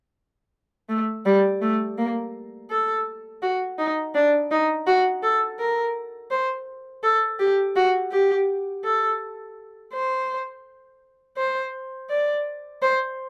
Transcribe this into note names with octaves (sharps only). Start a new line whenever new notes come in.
A3
G3
A3
A#3
A4
F#4
D#4
D4
D#4
F#4
A4
A#4
C5
A4
G4
F#4
G4
A4
C5
C5
D5
C5